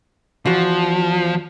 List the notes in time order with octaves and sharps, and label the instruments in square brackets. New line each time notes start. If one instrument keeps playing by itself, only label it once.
[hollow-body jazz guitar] E2 F#4 [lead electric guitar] F3